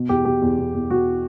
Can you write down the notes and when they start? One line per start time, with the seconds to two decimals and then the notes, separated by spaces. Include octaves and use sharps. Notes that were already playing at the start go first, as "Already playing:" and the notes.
Already playing: B2
0.09 E2 G4
0.25 B2 G4
0.42 E2
0.58 B2
0.74 E2
0.90 B2 F#4